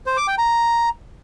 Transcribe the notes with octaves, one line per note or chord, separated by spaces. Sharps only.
C5
D6
G5
A#5